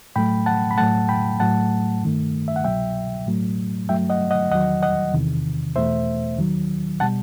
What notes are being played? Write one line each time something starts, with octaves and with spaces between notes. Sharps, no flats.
A2 F#3 A3 G5 B5
F#5 A5
B5
A2 F#3 A3 F#5 A5
G5 B5
A2 F#3 A3 F#5 A5
G2 D#3 A3
E5
F#5
C2 B2 F#3 E5 G5
A2 F#3 A3
G2 F#3 A3 E5 G5
D#5 F#5
D#5 F#5
E2 D#3 F#3 D#5 F#5
D#5 F#5
E2 C3 D#3
E2 B2 A3 C5 E5
D#2 D#3 F#3
B2 G3 F#5 A5